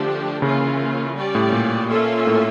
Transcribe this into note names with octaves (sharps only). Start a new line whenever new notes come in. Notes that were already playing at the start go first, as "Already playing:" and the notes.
Already playing: D3 F3 A3 D4 G4
C#3 E3 A#3 C#4 F4
G3 C#4 G4 D5
A2
A#2
A#3 C#4 F4 A4 E5
A2